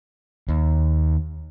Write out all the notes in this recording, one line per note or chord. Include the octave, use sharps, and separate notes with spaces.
D#2